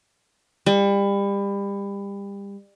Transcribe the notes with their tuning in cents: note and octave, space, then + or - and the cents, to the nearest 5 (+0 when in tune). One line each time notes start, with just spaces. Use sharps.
G3 +30